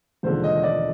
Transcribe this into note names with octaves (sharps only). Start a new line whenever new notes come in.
E1 D#2 D3 F3 G#3 C5
D#5
D#5
D5